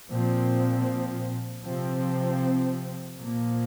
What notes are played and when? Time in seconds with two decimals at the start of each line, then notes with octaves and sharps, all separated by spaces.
0.10 A#2 F3 C4
1.64 C3 F3 C4
3.19 A#2 F3 A#3